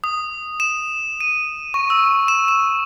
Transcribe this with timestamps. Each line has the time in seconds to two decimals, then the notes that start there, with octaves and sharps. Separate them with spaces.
0.04 D#6
0.60 E7
1.21 D#7
1.74 C#6
1.90 E6
2.28 E7
2.48 E7